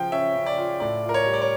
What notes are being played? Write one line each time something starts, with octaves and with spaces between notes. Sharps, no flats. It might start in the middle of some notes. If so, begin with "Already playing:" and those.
Already playing: C#3 F3 F4 G5
C#4 E5
C#3
D5
F4
A2 D5
F4
A#4
C#5
G3
D5
C#5